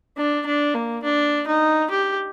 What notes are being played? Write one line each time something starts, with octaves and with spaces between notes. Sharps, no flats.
D4
D4
A#3
D4
D#4
G4